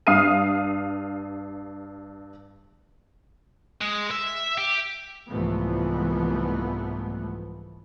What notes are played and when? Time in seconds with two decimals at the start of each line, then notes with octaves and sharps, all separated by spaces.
0.07 G2 F5 D#6 F6 C7 D#7
3.81 G#3
4.11 E5
4.58 G4
5.29 C2 G#2 E3 F3 A3 B3